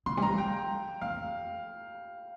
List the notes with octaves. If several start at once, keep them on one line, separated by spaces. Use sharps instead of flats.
D3 C6
G3
F3 A#5
G5
F2 F5